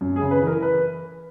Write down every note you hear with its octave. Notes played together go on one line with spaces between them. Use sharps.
F#2
G#4
C#3
B4
E3 A#4
B4